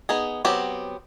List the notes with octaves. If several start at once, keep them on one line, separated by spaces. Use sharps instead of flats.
B3 D#4 G#4
F#3 B3 C4 G4